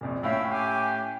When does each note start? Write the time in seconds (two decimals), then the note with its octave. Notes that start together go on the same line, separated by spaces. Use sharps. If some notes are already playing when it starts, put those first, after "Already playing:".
0.01 A#1 F2 A#2
0.23 A2 C#4 E5 F5 G5 E6
0.50 G4 G5 G#5 D6